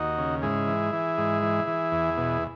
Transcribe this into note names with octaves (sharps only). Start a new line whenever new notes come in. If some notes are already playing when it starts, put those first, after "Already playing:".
Already playing: D#2 D#4 F#4
C#3
G#2 E4 G#4
E3
E3
G#2
E3
E3
E2
B2